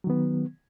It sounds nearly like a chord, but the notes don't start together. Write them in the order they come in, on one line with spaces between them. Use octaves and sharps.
F#3 D#3 B3